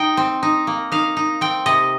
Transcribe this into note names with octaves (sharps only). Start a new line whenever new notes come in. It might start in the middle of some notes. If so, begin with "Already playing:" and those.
Already playing: D#4 G5
C4
D#4
A#3
D#4 F5
D#4
C4 G5
C3 D#5